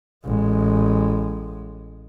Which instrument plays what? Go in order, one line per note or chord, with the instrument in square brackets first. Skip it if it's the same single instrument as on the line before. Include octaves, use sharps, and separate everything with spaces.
[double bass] A1 G#3